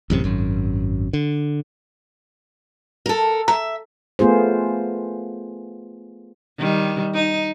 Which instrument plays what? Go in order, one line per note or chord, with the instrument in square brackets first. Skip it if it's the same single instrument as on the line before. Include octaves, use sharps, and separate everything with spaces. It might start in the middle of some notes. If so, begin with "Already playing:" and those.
[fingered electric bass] A1 F#2 C3
G#1 F#2
D3
[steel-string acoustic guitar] A4 A#4
[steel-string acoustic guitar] E5 [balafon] A#5
[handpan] A3 B3 F4 G#4 C5
[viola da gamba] D#3 G3
D#4